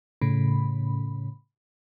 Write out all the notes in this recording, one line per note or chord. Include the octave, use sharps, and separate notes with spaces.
A2 C#3 B5